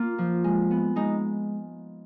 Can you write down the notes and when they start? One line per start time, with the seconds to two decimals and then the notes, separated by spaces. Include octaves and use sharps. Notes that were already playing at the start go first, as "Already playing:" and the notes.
Already playing: A#3 F4
0.18 F3
0.44 G#3
0.71 B3
0.96 G#3 D#4